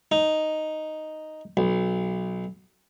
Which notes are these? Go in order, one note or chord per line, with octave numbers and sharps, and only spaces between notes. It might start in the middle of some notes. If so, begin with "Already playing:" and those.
D#4
B1